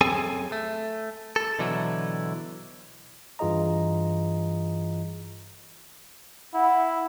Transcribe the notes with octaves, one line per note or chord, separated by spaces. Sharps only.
F#2 C4 G#4 A4 G#5
A3
A4
B2 D3 E3 F#3 E4
G2 E3 F4 G#4 D#5 A#5
E4 F#5